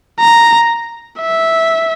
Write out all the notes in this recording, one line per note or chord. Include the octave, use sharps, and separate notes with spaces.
A#5
E5